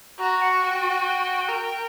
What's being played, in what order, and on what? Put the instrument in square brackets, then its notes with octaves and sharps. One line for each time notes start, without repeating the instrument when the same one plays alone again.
[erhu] F#4 [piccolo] A#5
[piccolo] F#5
G5
[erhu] A#4